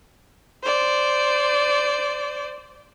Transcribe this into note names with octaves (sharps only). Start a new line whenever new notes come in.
C5 D5